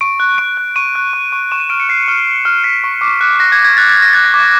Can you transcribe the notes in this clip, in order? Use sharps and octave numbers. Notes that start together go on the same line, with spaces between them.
C#6 D7
F#6
C#6 D7
F#6
C#6 D#7
F#6
C#6
C#6
C#6 E7
D#7
F6 D7
C#7
F6 C7
F6
C#6
F6
F6 B6
C#6
D6
F#6
F#6 A#6
G#6
F#6
G#6
F#6 A6
A6
F#6
A#6
F#6 A6
A#6
D6